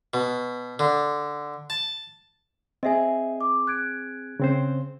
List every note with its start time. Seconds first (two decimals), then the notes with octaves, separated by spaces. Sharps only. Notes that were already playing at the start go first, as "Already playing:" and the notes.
0.14 B2
0.79 D3
1.70 A5
2.83 C4 G#4 D#5 E5 G#5
3.41 D6
3.67 F#6 G#6 D7
4.40 C#3 C4 C5